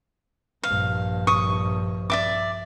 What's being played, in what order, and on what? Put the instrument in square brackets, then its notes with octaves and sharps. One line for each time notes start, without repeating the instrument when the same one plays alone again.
[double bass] A#1 G2 [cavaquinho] F5
[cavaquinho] C#6 D#6
D5 E5 D6